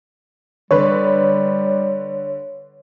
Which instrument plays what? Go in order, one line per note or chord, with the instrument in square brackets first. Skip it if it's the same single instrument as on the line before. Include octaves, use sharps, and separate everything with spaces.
[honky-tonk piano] D3 B4 [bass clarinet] G3 [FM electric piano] C#5